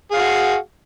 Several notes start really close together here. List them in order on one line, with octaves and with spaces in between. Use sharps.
G#4 F5 F#4